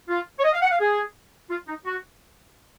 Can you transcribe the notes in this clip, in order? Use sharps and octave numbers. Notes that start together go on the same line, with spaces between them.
F4
C#5
D#5
F5
F#5
F5
G#4
F4
D#4
F#4